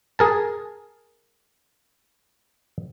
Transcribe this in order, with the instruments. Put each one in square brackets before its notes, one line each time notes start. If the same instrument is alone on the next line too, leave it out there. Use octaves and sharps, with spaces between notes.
[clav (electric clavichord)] G#4 A#4 A5